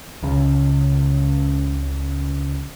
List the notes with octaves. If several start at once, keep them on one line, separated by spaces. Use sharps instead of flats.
C#2 C#3